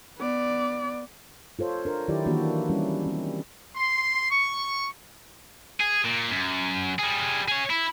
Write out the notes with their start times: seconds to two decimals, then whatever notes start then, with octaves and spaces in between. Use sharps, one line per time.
0.19 B3 D5
1.59 F4 A4 C5 C#5
1.85 D4 A#4
2.08 D#3 F#3 E4 G4 D5
2.26 D#3 E3 A#3 D4 F#4 G4
2.69 G3 C#4 E4
3.06 C4
3.76 C6
4.31 C#6
5.81 G#4
6.05 A#2
6.31 F#2
6.99 G3 G#4
7.48 G#4 C#5
7.70 E4